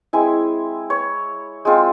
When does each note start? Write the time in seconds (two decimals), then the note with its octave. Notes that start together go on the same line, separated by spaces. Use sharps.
0.13 G#3 C4 E4 G#5
0.90 C#5
1.65 G#3 C4 F4